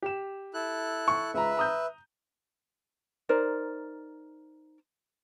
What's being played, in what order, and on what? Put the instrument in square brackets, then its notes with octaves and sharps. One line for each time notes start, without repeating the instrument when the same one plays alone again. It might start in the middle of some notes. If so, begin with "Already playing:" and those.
[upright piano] G4 E7
[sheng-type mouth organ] E4 A4 F#6
[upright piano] C#6
[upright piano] C#2 A#5 [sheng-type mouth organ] B4 E5
[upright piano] A#5 D#6 G6
[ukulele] D#4 A#4 C5 D5